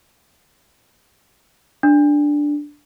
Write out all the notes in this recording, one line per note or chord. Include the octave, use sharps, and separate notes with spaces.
D4